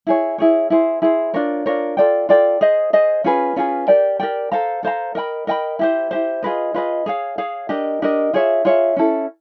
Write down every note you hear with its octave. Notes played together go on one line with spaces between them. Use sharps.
E4 G#4 C#5
E4 G#4 C#5
E4 G#4 C5
E4 G#4 C5
D4 F4 A#4 C#5
D4 F4 A#4 C#5
F4 A4 D5 G5
F4 A4 D5 G5
G#4 C5 D#5
G#4 C5 D#5
C#4 F4 G#4 B4
C#4 F4 G#4 B4
G4 A#4 D5 G5
G4 A#4 D5 G5
A4 C5 F5 A#5
A4 C5 F5 A#5
A#4 D#5 G5 B5
A#4 D#5 G5 B5
E4 G4 C5
E4 G4 C5
F4 G#4 B4 D#5
F4 G#4 B4 D#5
G#4 C#5 F5
G#4 C#5 F5
D4 G4 A#4 D#5
D4 G4 A#4 D#5
F4 G#4 C#5 E5
F4 G#4 C#5 E5
C#4 E4 A4